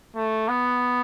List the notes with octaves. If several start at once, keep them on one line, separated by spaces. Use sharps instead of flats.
A3
B3